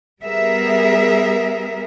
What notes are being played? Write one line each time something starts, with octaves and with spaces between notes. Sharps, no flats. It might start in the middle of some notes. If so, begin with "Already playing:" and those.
G3 B3 G#4 A#4 E5